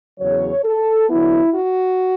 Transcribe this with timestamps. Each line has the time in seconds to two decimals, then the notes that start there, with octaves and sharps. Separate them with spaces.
0.19 E2 C#3 F#3 C#5
0.64 A4
1.09 D3 F#3 B3 E4
1.54 F#4